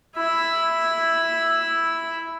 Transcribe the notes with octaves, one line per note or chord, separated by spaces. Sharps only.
E4 E5